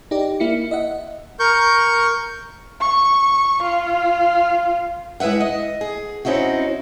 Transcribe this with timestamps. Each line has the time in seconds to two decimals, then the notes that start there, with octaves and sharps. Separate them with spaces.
0.11 D#4 G4 D5
0.40 A#3 E4 C#7
0.71 D#5 E5 F#5
1.40 A#4 C#6 G6
2.81 C#6
3.63 F4
5.20 G#3 E4 B4 E5 F#5
5.40 D#5
5.81 G#4
6.25 C4 C#4 D#4 E4 F#4